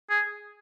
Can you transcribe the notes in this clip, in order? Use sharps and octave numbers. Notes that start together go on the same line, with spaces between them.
G#4